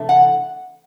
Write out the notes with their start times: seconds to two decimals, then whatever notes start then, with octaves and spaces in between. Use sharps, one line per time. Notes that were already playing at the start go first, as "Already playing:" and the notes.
Already playing: C3 E3 A3 D4
0.09 F#5